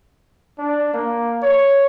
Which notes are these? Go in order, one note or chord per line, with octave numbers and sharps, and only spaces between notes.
D4
A#3
C#5